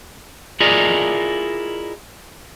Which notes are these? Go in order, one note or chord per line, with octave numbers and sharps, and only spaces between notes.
E4 F4 G#4 A#4 D5 D#5